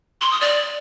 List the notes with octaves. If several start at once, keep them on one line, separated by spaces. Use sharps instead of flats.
C6
D#6
D5